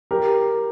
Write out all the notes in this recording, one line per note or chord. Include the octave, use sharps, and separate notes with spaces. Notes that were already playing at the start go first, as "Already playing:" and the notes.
G4 A#4